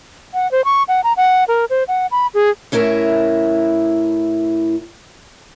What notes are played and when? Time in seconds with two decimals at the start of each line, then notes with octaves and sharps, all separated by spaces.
0.34 F#5
0.52 C5
0.65 C#6
0.88 F#5
1.04 A#5
1.17 F#5
1.48 A#4
1.70 C5
1.88 F#5
2.11 B5
2.34 G#4
2.72 A2 C#4 E4 A#4 E5